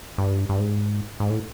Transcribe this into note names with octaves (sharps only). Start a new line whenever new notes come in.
G2
G2
G#2
G#2
A2